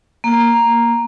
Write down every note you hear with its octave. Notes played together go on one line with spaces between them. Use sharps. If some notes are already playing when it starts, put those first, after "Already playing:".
A#3